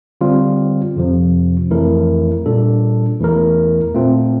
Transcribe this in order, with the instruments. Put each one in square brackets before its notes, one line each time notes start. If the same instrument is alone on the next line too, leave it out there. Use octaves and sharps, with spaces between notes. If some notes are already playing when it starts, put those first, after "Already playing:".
[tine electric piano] D3 G3 C4 F4
F2 C3 F3
F2 E3 A3 E4 A#4
A#2 G3 D4 A4
E2 E3 A3 E4 A#4
A#2 A3 C4 F4